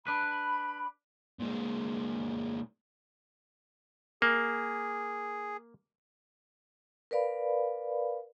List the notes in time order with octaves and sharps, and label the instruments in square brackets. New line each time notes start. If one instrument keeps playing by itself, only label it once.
[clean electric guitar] D4 B4 [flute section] B5
[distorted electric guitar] A#2 G#3
[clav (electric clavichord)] A#3 [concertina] G#4
[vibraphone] A#4 B4 D5 F5 B5